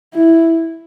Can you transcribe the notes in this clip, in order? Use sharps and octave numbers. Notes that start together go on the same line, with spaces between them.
E4